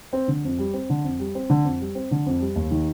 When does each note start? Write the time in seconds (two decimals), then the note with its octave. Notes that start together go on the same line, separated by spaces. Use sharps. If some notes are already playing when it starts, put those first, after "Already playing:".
0.13 C4
0.28 D3
0.44 F2
0.58 G3
0.73 C4
0.90 D3
1.04 F2
1.19 G3
1.35 C4
1.50 D3
1.64 F2
1.80 G3
1.95 C4
2.11 D3
2.26 F2
2.41 G3
2.56 D#2
2.71 D#3